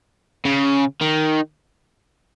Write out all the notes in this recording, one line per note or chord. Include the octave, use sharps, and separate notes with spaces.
C#3
D#3